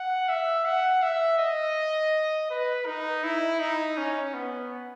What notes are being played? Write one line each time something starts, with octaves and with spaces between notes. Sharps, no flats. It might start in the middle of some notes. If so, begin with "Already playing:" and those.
Already playing: F#5
E5
F#5
E5
D#5
B4
D#4
E4
D#4
C#4
B3